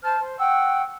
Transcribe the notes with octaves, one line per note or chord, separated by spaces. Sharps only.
C5 A5 F6 G6
C5
F#5 G5 C#6 E6